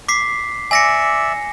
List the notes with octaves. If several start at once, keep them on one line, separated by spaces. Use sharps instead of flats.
D6 B6 C7
D5 E5 G#5 A#6 C#7